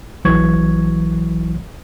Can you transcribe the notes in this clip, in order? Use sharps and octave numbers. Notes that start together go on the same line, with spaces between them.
A#1 E3 F#3 C#6 G#6